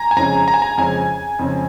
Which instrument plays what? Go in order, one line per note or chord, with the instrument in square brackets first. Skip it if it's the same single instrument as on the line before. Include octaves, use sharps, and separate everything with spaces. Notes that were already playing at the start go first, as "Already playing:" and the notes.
Already playing: [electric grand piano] G#5 A#5
G#5
[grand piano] F2 C#3 G#3 C#4 [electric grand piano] A#5
[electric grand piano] A#5
G#5
A#5
[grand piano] F2 C#3 G#3 C#4 [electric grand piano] G#5
[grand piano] F2 C#3 G#3 C#4